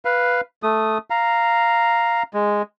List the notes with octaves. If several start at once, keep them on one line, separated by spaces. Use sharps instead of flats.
B4 F5
A3 D#6
F5 A#5
G#3